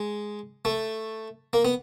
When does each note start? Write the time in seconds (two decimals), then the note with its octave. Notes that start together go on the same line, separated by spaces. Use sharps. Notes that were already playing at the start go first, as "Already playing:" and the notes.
Already playing: G#3
0.65 A3
1.53 A#3
1.65 B3